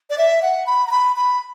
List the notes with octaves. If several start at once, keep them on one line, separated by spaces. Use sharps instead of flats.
D5
E5
F#5
B5
A#5
B5
B5